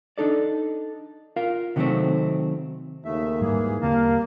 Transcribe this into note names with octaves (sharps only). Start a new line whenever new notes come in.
D4 D#4 A4 D5
F4 A#4 F5
C3 D#3 F#3 G3 A3 C4
D#2 C#3 A3 E5
G#2 E3 G3 G#3 A#3 G#4
E2 D3 G3 A#3 C4 A#4 F5 A5